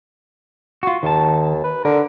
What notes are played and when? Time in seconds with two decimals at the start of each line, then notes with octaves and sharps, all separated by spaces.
0.83 F4 F#4
1.03 D#2 D#3 A5
1.64 B4
1.85 D3 A#4